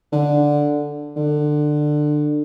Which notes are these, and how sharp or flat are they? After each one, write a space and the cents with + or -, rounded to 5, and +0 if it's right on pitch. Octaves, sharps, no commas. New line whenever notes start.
D3 +0
D3 +20